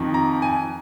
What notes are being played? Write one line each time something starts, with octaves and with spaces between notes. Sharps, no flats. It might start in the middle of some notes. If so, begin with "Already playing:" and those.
Already playing: F2 D#3
A#5
G#5